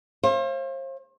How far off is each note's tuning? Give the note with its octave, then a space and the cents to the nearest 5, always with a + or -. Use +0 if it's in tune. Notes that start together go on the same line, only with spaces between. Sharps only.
C5 +40 F5 -30